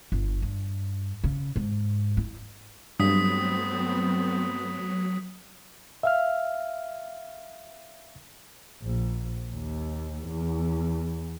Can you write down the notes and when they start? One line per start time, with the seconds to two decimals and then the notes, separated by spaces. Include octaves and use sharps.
0.12 G1
0.42 G2
1.24 C#3
1.56 G#2
2.17 E4
3.00 G2 F#3 A3 B3 C4 D#6 B6
6.03 E5 F5 F6
8.83 A#1
9.51 D#2
10.26 E2